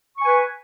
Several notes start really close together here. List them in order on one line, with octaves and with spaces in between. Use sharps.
C#6 G#5 B4